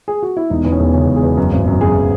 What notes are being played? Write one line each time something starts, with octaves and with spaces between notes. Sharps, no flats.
G#4
F#4
E4
E1 D#4
E2
C#4
E1
C#3 C#4
E1
G#4
E2
F#2
G#1
F#2
F#2 G#4